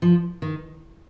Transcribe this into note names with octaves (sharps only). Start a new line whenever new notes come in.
F3
D#3